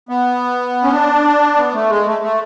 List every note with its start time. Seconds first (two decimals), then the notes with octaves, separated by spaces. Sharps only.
0.09 B3
0.84 C#4
0.91 D4
1.57 B3
1.74 A3
1.89 G#3
2.06 A3
2.22 A3